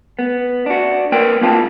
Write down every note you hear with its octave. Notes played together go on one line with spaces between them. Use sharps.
B3
D4 F#4
A#3 A#4 B4 G5
A#3 C4 F4 F5 A5